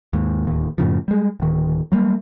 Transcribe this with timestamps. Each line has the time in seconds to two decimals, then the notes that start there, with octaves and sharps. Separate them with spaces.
0.13 D#2 G#2
0.45 D1 D#2
0.78 F#2 A2 C#3 F3
1.08 G3 G#3
1.40 D1 D#3
1.92 F#3 G3 A#3